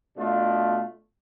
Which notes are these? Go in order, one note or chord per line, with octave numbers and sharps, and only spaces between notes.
B2 A3 D4 F4